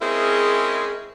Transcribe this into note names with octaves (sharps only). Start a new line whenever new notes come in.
G#3 C4 C#4 E4 G#4 A#4